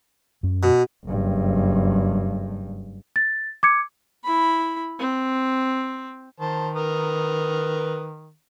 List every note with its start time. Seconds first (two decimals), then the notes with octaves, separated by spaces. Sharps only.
0.43 F#2 C#4
0.63 B2
1.06 F#1 G2
3.16 A6
3.63 D6 G#6 C#7
4.24 E4 B5
4.99 C4
6.40 D#3 C5 A5
6.75 A#4 B4 D#6